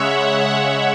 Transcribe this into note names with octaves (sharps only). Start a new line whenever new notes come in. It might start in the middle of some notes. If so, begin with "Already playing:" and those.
Already playing: C#3 G#3 C#5 E5 F#5
E5